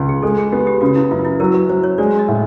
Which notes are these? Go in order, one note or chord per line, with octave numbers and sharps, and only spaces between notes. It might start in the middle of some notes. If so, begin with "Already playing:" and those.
Already playing: C#2
G#4
G#3 A4
G#4
B3 G4
G4
C#3 F#4
E4
F#2 F4
E4
F#3 A#4
B4
F#3 C5
C#5
G#3 D5
D#5
A2